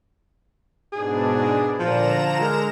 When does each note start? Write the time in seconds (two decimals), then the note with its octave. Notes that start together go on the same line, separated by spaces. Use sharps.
0.92 G#2 B2 D4 G#4
1.79 A#2 D3 F3 A#5 E7
2.40 G#3 A#4